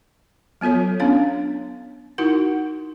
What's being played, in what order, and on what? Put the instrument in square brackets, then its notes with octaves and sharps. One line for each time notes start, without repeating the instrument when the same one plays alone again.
[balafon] F#3 B3 F4 A4 C#5
B3 C#4 D4 C#5 F5
D#4 E4 F#4 A#4 F#5